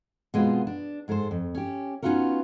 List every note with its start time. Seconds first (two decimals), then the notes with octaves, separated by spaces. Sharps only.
0.34 B2 G#3 B3 C4 F4
0.67 D4
1.08 G#2 G#3 A4 A#4 C5
1.31 F2
1.55 C#4 G4
2.02 B3 C#4 D#4 F4 F#4 A#4